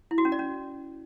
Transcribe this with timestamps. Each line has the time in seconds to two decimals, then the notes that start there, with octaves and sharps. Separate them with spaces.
0.11 E4
0.18 F#4
0.25 C#4
0.32 D5
0.39 C#4